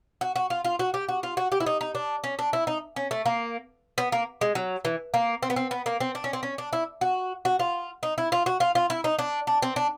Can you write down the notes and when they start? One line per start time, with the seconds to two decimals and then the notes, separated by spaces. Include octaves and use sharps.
0.21 F#4
0.36 F#4
0.50 F4
0.65 F4
0.79 F#4
0.94 G4
1.09 F#4
1.23 F4
1.37 F#4
1.52 G4
1.60 E4
1.66 D#4
1.81 D#4
1.95 D4
2.24 C#4
2.39 D4
2.53 E4
2.67 D#4
2.96 C#4
3.11 A3
3.26 A#3
3.98 B3
4.12 A#3
4.41 G#3
4.55 F#3
4.85 E3
5.14 A#3
5.43 C4
5.50 B3
5.56 C4
5.71 B3
5.86 A#3
6.00 C4
6.15 D4
6.24 C#4
6.33 C4
6.43 C#4
6.58 D4
6.73 E4
7.01 F#4
7.45 F#4
7.59 F4
8.03 D#4
8.18 E4
8.32 F4
8.46 F#4
8.60 F4
8.75 F4
8.90 E4
9.04 D#4
9.19 D4
9.47 D4
9.62 C4
9.76 D4